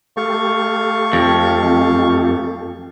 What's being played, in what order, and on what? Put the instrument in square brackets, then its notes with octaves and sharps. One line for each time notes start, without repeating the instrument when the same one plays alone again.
[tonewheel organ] A3 G4 A4 [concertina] F5 C#6
[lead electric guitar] F2